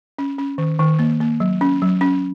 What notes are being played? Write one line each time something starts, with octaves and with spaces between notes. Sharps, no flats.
C#4
C#4
D#3
D#3
A#3
A#3
F#3
C#4
F#3
C#4